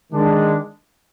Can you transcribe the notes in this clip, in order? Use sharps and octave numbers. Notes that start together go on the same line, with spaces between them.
D#3 G#3 D4